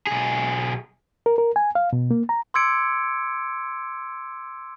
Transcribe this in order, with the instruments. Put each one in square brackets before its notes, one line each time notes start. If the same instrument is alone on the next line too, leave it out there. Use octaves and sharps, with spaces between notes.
[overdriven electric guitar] B1 G#4
[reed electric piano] A#4
A#4
G#5
F5
B2
A#3
A#5
[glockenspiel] C6 D6 E6 G#6 C#7 D7